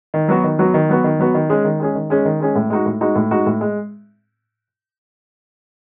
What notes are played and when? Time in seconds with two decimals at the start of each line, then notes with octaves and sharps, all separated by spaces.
0.14 D#3
0.28 F#3 B3 F#4
0.44 D#3
0.59 F#3 B3 F#4
0.74 D#3
0.89 F#3 B3 F#4
1.04 D#3
1.19 F#3 B3 F#4
1.34 D#3
1.50 G#3 C#4 G#4
1.65 D#3
1.80 G#3 C#4 G#4
1.95 D#3
2.10 G#3 C#4 G#4
2.25 D#3
2.40 G#3 C#4 G#4
2.56 A2
2.70 G#3 D#4 F#4
2.86 A2
3.01 G#3 D#4 F#4
3.16 A2
3.31 G#3 D#4 F#4
3.46 A2
3.61 G#3